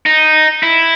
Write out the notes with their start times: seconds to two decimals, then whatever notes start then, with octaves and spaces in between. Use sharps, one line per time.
0.06 D#4
0.63 E4